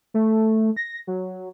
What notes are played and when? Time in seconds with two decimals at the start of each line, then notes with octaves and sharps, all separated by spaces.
0.14 A3
0.76 A#6
1.07 F#3